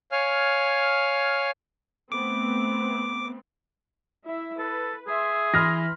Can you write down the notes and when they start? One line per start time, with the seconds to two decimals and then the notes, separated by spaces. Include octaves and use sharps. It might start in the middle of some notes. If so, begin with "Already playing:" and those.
0.12 C#5 F5 G#5 F6
2.12 A3 B3 C4 D6
4.24 E4 E5
4.59 A4 B4
5.07 G#4 E5 C6
5.54 E3 B5 C6 F6 A#6